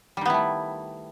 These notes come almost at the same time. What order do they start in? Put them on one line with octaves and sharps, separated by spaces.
G3 D#3 B3 E4 A3